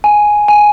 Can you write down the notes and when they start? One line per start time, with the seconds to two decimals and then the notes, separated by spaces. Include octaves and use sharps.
0.04 G#5
0.48 G#5